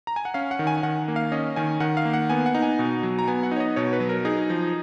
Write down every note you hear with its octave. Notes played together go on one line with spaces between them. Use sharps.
A#5
G#5
F#5
C#4 F5
F#5
D#3
G#5
G#5
D#3 F#5
A#3
F5
C#4 D#5
D#3 G#5
D#3 F#5
F5
A#3
F#5
B3 G#5
F#5
D#4
G#5
B2
F#3
A#5
B3 G#5
F#5
D#4 C#5
D#5
B2 C#5
B4
F#3
A#4
D#4 G#4
F3